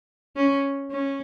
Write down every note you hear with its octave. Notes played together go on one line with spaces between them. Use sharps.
C#4
C#4